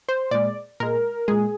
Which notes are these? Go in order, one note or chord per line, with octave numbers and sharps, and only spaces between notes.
C5
A#2 G#3 D5
A#2 G#3 A#4
A#2 G#3 G#4